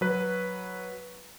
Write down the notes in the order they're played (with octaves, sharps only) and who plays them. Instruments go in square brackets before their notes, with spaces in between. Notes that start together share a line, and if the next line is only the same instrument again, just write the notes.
[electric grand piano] F#3 B4